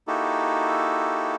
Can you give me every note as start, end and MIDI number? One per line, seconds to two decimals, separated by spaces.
0.08 1.36 58
0.08 1.36 63
0.08 1.36 64
0.08 1.36 66
0.08 1.36 67
0.08 1.36 69